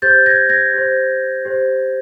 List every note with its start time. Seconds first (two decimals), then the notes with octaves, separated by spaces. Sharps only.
0.02 G4 C5 G6 A6
0.26 G#6 A#6
0.49 G#6 A#6
0.74 G4 C5
1.45 G4 C5